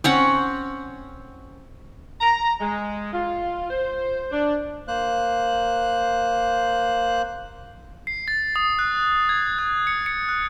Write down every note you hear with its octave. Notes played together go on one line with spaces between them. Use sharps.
C4 C#4 F#5
A#5
G#3
F4
C5
D4
A#3 C5 F#6
C7
A6
D#6
F#6
G#6
F#6
C#7
C#7
F#6